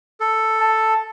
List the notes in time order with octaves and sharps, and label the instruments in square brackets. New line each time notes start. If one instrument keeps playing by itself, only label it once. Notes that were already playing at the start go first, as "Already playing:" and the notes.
[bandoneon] A4
[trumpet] A5